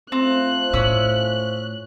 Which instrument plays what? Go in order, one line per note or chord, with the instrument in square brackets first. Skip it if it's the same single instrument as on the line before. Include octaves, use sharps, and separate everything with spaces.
[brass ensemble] A3 F4 C5 [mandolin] C4 [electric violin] F#6
[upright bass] A2 [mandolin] C#4 E6